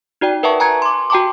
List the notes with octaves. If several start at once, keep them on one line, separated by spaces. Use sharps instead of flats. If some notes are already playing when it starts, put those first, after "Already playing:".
D#4 F#4 D5 G5
A#4 B4 E5 F#5 A5 C#6
G#5 A#5 F#6 G#6 C#7
C6 D6
F#4 G5 A5 C6 D6